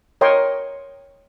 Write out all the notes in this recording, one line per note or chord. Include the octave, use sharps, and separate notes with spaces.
A#4 C#5 D#5 G5 C6